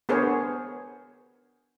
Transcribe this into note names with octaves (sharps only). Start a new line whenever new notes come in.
B3 D4 G#4 A#4 C5 C#5